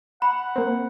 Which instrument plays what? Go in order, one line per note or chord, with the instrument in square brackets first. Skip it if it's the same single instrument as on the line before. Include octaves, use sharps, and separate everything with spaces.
[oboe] F#5 [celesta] B5
[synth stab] A#3 C4